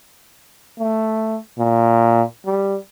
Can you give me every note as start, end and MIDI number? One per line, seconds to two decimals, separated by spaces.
0.80 1.37 57
1.59 2.22 46
2.46 2.76 55